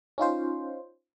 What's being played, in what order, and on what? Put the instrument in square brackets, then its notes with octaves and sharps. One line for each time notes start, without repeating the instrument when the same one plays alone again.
[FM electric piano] C#4 D#4 F4 C5